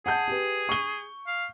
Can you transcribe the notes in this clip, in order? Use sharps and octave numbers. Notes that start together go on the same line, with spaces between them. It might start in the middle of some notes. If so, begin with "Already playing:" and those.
G#4 F#5 A5 G6
G4 B4
C#6 G7
F5